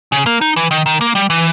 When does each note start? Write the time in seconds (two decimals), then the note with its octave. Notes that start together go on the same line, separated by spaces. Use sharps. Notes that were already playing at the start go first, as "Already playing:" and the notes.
0.12 C#3
0.26 A#3
0.41 D#4
0.56 E3
0.71 D#3
0.86 D#3
1.01 A#3
1.15 G3
1.30 E3